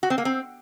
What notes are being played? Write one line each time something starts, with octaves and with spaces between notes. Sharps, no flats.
F#4
C4
A#3
C4